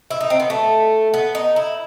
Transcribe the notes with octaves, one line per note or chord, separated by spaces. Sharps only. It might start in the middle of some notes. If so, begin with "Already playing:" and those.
E4
D#4
C4
B3
A3
B3
D#4
E4